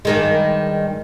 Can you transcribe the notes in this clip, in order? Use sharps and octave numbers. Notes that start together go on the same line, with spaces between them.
G2 D#3 G#3